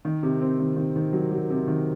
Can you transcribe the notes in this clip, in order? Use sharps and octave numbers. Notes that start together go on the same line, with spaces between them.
D#3
C3
C4
D#3
D#3
D#3
F#3
F#3
C3
D#3